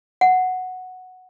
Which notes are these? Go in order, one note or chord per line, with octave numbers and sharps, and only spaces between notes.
F#5